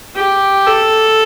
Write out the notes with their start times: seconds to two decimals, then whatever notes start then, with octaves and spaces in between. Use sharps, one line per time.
0.15 G4
0.66 A4